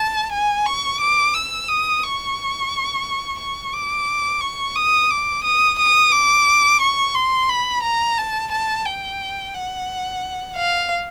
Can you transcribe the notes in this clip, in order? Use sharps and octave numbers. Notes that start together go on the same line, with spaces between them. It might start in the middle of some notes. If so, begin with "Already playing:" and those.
Already playing: A5
G#5
C#6
D6
E6
D#6
C#6
C#6
D6
C#6
D#6
D6
D#6
D#6
D6
C#6
C6
B5
A#5
A5
A5
G5
F#5
F5